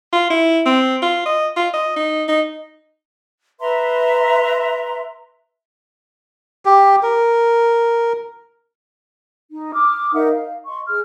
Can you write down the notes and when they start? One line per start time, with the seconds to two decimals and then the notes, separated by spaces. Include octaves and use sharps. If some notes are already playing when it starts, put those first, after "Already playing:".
0.12 F4
0.30 E4
0.65 C4
1.02 F4
1.26 D#5
1.56 F4
1.73 D#5
1.96 D#4
2.28 D#4
3.60 B4 E5 A#5 C6
6.65 G4
7.03 A#4
9.51 D#4
9.73 D6 D#6 F6
10.13 D#4 A#4 E5 F#5
10.30 F5
10.66 D#5 C6 C#6
10.87 G#4 F6